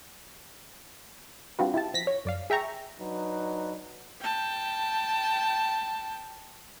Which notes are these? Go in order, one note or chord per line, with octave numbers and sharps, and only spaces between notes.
G3 C4 D4 F4 F#4 B4
E4 F4 G4 A5
F3 A#6 B6
C#5
F#2 D5 F5
G#4 E5 G5 A#5 C#6
F#3 D4 D#4 B4
G5 A5